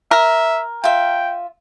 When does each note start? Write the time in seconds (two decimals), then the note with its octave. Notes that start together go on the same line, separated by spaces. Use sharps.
0.11 A#4 E5
0.84 F4 E5 G5